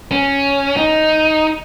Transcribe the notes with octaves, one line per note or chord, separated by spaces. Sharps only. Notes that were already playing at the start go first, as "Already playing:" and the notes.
C#4
D#4